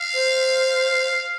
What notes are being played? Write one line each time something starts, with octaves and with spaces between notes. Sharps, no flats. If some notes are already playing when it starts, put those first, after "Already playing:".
Already playing: F5
C5